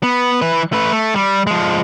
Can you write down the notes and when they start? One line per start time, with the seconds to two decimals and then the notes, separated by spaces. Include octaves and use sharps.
0.03 B3
0.41 E3 B4
0.73 A3 B4
0.92 A3
1.15 G3
1.47 F3 G#3